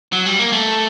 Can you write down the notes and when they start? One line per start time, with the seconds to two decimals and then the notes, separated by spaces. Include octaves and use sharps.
0.13 F#3
0.26 G3
0.39 A#3
0.52 A3